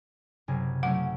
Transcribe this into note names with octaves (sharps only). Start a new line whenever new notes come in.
F#1 C3 G#5
F#3 A3 C#4 F#5